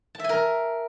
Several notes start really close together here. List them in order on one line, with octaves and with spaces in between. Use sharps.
A5 E5 G#5 A#4